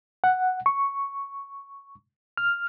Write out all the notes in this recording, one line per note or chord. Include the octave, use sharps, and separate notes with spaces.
F#5
C#6
F6